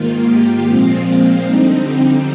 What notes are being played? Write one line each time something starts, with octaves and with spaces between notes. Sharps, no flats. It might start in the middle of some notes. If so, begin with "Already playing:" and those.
Already playing: G#2 D#3 A#3 F4
G4
A#2 F3 G#3 C4 F4
F2 D3 G3 C4 D#4
D#4